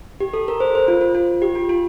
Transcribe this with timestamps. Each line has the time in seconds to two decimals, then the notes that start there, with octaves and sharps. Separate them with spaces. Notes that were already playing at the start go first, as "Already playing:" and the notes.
0.20 G4
0.33 A4
0.48 A#4
0.60 C5
0.75 C5
0.88 F4
1.01 F4
1.15 F4
1.42 G4
1.55 F4
1.69 F4